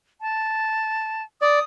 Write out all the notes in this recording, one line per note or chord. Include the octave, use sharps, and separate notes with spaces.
A5
D5 D#6